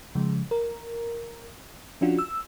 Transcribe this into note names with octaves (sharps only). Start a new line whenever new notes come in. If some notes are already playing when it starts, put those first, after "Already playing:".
C#3 F3 G#3
A#4
F3 C#4 D4 F4 F#4
E6